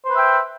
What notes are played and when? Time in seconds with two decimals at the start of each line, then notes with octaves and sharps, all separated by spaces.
0.04 C5
0.09 B4
0.14 E5
0.18 G5